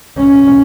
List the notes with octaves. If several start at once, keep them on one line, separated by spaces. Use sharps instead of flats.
C#4